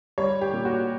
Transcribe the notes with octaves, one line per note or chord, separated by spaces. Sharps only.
G3 C#5
G4
A#2
F#4